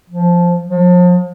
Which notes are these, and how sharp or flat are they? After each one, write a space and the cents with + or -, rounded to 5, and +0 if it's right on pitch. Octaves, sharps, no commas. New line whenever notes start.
F3 +0
F3 +40